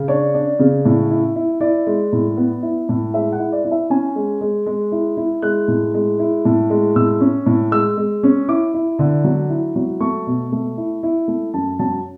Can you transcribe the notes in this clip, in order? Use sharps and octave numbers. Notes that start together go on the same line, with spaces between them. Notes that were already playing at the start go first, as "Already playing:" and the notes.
Already playing: C#3
D4 C#5
D4
C#3
A2
E4
E4
E4 D5
G#3
A2
B3
E4
A2
G#3 E5
F#5
E4
D5
E4
E5
C#4 G#5
G#3
G#3
G#3
E4
E4
G#3 F#6
A2
G#3
E4
A2
G#3
A2 E6
C#4
A2
G#3 E6
G#3
C#4
E4 D6
E4
D3
F#3
E4
F#3
A3 C#6
B2
A3
E4
E4
A3
F#2 A5
F#3 A5